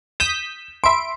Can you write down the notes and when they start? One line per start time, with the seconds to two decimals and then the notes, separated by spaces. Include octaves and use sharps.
0.20 D#6 G6 B6 E7
0.84 E5 B5 C6 D7